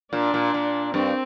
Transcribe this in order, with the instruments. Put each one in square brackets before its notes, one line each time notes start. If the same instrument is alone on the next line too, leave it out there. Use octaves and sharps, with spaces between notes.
[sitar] A#2 [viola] D4
[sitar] A#2
A#2
[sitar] G2 [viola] C4